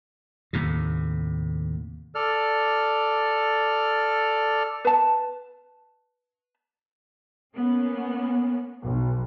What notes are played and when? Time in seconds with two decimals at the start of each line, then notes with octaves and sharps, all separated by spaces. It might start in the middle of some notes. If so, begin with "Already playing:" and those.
0.53 D#2 A2 C3
2.15 A4 D5 F6
4.85 B4 A5
7.56 A#3 B3 C#4
8.82 B1